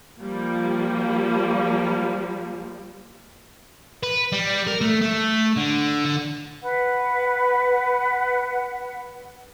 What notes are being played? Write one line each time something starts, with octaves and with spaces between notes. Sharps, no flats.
F3 G3 A#3
B4
G3
A#4
A3
A3
D3
D3
B4 F#5